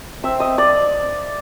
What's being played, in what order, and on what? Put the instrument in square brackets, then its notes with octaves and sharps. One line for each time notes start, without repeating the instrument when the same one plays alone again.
[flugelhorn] C4 [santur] E5
[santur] D#5
D5